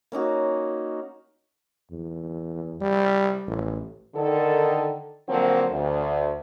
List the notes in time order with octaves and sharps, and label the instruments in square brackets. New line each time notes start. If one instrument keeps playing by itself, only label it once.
[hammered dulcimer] A#3 C#4 D#4 F#4
[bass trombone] E2
G3
A1
[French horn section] D3 D#3 A4
D3 F3 F#3 A#3 C4
D2